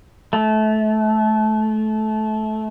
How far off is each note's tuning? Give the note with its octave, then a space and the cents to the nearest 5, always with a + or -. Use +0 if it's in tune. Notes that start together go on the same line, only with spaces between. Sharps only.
A3 -25